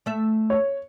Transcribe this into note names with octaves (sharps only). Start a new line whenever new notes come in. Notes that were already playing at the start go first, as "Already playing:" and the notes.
A3 E5
C#5